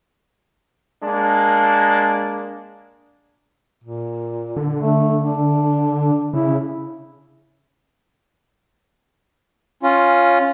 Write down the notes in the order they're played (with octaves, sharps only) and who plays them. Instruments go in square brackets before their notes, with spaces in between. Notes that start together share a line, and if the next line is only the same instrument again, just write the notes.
[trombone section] G#3 A#3 D4
[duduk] A#2
[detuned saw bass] D3
[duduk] A3
D4
[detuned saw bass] C#3 [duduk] E4
[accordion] C#4 F4